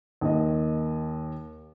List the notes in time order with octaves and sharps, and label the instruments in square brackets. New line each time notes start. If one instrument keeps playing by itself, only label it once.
[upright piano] D#2 D#5